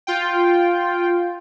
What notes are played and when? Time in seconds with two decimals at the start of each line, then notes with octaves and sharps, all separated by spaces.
0.07 F4 G5